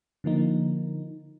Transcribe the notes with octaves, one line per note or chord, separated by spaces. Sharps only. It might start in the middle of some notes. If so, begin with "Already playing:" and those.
D3 F3 A#3 D#4